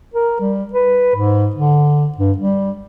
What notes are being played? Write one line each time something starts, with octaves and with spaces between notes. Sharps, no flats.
A#4
G3
B4
G#2
D3
G2
G3